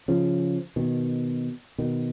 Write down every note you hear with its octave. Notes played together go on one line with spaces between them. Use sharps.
C#3 F3
B2 D#3
B2 D#3